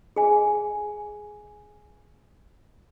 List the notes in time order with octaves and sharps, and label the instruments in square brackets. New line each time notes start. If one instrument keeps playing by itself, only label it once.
[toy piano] G#4 G#5